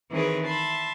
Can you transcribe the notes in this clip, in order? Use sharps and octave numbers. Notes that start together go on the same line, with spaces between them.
D#3 E3 C4 G#4 B4 C#5
E5 A5 B5 C6